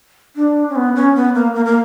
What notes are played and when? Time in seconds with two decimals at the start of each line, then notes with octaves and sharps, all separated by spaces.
0.36 D4
0.69 C#4
0.76 B3
0.96 C#4
1.15 B3
1.35 A#3
1.55 A#3
1.65 A#3